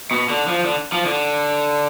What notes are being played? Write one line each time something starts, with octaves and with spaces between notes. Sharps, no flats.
B2
D3
F3
D3
F3
D3